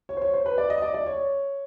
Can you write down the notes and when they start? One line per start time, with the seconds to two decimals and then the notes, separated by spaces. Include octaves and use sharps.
0.09 C#5
0.17 C5
0.22 C#5
0.34 C5
0.46 B4
0.58 D5
0.70 D#5
0.82 D5
0.94 D5
1.06 C#5